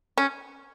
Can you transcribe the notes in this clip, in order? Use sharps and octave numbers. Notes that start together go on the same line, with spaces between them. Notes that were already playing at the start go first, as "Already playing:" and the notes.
C#4